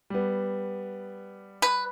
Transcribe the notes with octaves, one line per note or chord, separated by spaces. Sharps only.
G3 B3
B4